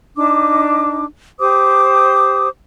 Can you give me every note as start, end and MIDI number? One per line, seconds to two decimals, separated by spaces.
0.15 1.05 62
0.15 1.05 63
0.15 1.05 86
1.40 2.48 67
1.40 2.48 72
1.40 2.48 86
1.40 2.48 87